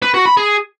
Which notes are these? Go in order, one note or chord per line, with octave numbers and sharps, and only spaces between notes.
B4
F#4
B5
G#4